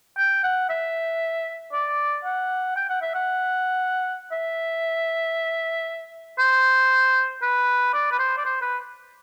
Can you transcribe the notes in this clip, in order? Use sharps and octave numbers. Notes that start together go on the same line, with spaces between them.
G5
F#5
E5
D5
F#5
G5
F#5
E5
F#5
E5
C5
B4
D5
B4
C5
D5
C5
B4